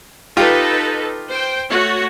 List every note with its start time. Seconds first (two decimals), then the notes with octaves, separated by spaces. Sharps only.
0.37 D#4 F4 G4 A4 B4
1.28 C5 G5
1.68 A3 F#4 C#5